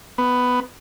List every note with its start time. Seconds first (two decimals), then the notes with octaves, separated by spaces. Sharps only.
0.18 B3